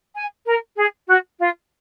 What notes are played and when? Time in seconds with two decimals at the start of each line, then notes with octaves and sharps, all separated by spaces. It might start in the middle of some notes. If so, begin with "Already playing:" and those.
0.14 G#5
0.46 A#4
0.76 G#4
1.07 F#4
1.38 F4